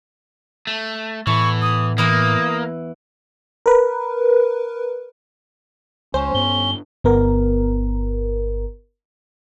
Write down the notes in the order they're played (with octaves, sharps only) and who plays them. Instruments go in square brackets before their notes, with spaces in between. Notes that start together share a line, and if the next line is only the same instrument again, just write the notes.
[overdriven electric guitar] A3
[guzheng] E2 A4 [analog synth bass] A2 [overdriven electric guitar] E3 [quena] C#6
[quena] D#6
[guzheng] E3 E4 G#5 [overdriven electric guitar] A#3 [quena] D#6
[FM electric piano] A#4 B4
[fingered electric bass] C#2 [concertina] C#4 [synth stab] C5
[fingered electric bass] G2 B3 [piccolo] G7
[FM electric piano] G1 B3 A#4